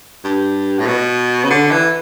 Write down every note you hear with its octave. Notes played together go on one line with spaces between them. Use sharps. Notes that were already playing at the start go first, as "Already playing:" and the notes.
G2
A2
B2
C#3
D3
E3